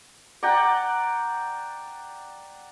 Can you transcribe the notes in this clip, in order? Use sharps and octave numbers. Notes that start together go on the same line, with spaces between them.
D5 F#5 G5 A#5